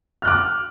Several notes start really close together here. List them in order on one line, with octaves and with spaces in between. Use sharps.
F6 F#6 D6